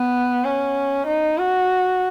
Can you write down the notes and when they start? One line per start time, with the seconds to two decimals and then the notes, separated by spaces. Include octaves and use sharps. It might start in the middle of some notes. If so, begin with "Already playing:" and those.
Already playing: B3
0.45 C#4
1.07 D#4
1.38 F#4